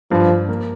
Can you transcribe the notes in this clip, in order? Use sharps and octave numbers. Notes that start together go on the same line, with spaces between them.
G2 F3
G2
A#3